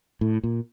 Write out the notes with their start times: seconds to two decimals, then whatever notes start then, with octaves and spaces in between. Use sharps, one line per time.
0.21 A2
0.44 A#2